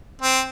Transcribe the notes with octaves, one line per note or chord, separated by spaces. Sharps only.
C4